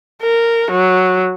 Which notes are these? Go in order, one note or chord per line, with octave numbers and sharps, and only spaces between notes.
A#4
F#3